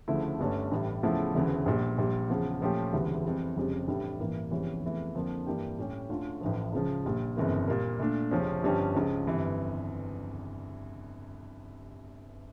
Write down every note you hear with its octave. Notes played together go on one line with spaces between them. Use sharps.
D2 C#3 F3 A3 E4
G1 G2 D3 A3 C#4
A1 A2 G3
E2 C#3 F3 A3 E4
E1 D2 C#3 E3
A#1 A#2 G3
A#1 A#2 G3
E2 C#3 F3
A#2 F3 A3 C#4 G4
E1 D2 C#3 E3 G3
F2 E3 G3
F1 F2 C#3 G3
A1 A2 G3 D4
A1 G2 E3 A#3
F1 E2 E3 G3 C#4
F1 E2 E3 A3
F2 D3 F3 A#3 D4
G2 E3 A#3 D4 G4
A2 G3 C#4 G4
D2 D3 A3 C#4 F4
A1 A2 F3
C#2 C#3 F3
A#1 A#2 G3
G1 F2 C#3 E3 A#3
A#2 G3 A#3
A#2 A3 D4
F1 F2 C#3 F3 C#4
G1 G2 F3 C#4 G4
C#2 C#3 F3
G1 F2 E3 G3